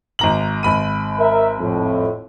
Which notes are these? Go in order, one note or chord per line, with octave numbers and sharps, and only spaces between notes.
G#1 A#5 F#7
G#1 B5 D#7
A#4 E5
F2 A2